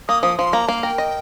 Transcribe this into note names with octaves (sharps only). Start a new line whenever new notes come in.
A#3 D#6
F3 D#6
F3 C6
A#3 A#5
A#3 F5
A#4 G5
D#5